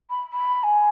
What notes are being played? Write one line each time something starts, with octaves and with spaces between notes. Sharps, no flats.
B5
B5
G#5